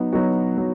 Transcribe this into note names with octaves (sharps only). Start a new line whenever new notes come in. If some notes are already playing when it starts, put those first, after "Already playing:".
Already playing: F#3 B3 D#4 F#4
F#3 B3 D#4 F#4
F#3